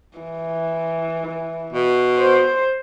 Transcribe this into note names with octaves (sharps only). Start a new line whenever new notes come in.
E3
B2
C5